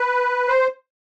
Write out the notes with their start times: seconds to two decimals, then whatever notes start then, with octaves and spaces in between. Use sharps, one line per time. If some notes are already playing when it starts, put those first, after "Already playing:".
Already playing: B4
0.48 C5